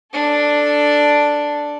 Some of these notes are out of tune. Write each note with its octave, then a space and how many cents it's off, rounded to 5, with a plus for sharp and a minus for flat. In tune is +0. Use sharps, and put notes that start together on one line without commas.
D4 +0 A4 +0